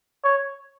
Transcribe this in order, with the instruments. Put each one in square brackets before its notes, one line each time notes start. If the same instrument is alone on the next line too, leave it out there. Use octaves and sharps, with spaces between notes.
[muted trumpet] C#5